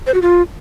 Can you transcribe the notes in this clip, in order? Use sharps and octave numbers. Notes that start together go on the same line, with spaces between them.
C5
F#4
F4